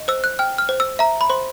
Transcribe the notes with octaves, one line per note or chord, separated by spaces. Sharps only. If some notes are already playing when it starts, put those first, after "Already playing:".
Already playing: D#5
C5 E6
F#6
G5 F6
F6
C5
E6
E5 A#5
B5
C5 C6